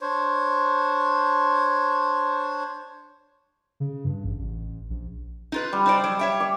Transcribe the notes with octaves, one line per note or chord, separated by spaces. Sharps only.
D4 C5 C#5
C#3
G2
A1
A1
A#1
D#4 F4 B4
G3
D#4 C5 D5
F#3
C#5 E5 G5
D5